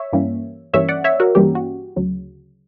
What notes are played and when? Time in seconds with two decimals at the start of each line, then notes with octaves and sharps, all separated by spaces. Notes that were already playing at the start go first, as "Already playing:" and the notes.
Already playing: C#5 E5
0.13 G2 E3 G3 A#3 C#4
0.74 G2 E3 G3 A#3 C#4 C#5 E5
0.89 D5 F#5
1.04 C#5 E5
1.20 F#4 A#4
1.35 G2 E3 G3 A#3 C#4 G4
1.55 F#4
1.96 D2 C#3 F#3